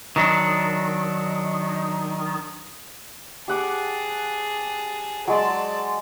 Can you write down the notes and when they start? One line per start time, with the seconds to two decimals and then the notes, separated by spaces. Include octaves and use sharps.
0.16 D#3 F#3 D4
3.48 G4 G#4 F#5 A5 D6
5.28 F#3 G#3 D5 A5 C6